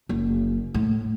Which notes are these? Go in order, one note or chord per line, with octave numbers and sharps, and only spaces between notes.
F#1
A2